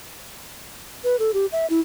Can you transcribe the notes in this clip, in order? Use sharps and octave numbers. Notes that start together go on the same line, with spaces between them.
B4
A4
G4
E5
E4